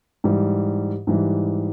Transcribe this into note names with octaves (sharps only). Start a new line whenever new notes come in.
G#2 E3 G3
G#2 E3 G3